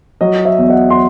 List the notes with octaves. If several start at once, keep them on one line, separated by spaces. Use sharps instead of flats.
F#3 D#5
E5
E2
D#5 F#5
C6